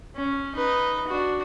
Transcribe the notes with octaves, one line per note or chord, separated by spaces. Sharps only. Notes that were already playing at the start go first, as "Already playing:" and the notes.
C#4
D#4 B4
D4 F#4